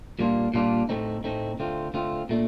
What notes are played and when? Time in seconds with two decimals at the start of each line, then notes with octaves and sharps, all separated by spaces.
0.19 A#2 G3 A#3 D4 F4
0.54 A#2 G3 A#3 D4 F4
0.89 A2 A3 C4 D#4
1.24 A2 A3 C4 D#4
1.59 D3 A3 C4 F4
1.94 D3 A3 C4 F4
2.29 A#2 A3 D4